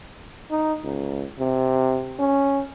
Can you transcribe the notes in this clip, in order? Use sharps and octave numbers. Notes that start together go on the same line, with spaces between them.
D#4
C#2
C3
C#4